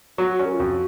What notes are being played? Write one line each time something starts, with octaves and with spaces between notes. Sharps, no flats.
F#3 F#4
F#4
C#4
A#4
F4
F2 F#4